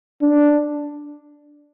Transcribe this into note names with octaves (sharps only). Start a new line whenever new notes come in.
D4